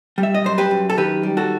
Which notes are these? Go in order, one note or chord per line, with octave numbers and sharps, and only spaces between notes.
G3
E5
D#5
F#2 C5
G4 B4
F#2
A4
D#3 G4 B4
G3
F#4 A4